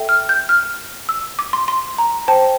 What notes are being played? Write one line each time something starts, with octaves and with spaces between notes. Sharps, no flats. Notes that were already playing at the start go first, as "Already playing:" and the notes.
Already playing: A4 E5 G5
F6
G6
F6
E6
D6
C6
C6
A#5
C5 G5 A5